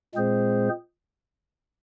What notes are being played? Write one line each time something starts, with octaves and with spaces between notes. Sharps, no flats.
A#2 G#3 C4 G#4 C5